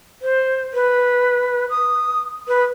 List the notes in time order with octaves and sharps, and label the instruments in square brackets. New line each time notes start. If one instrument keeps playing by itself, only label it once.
[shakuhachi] C5
B4
D#6
B4